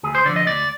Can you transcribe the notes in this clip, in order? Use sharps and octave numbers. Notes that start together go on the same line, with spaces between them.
D2 G#4
C5
D3 F3 D5
D#5
D2 D5